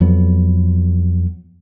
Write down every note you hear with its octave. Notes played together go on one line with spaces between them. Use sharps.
F2 F#3 B3